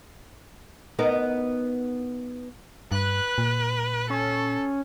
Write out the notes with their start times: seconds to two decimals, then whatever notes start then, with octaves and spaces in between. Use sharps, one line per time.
0.99 B3 D#4 A#4
2.92 G2 B4 F#6
3.38 A#2
4.10 C#4 A4